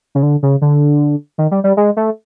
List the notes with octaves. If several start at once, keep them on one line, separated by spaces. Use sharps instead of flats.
C#3
D3
C#3
D3
D#3
G3
G3
G#3
A3